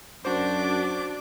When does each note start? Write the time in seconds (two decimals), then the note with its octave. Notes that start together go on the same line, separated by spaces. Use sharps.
0.25 F#2 D4 F#4 C5 D6